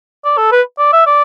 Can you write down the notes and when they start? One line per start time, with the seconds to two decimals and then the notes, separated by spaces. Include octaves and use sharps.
0.25 D5
0.38 A4
0.52 B4
0.78 D5
0.93 E5
1.07 D5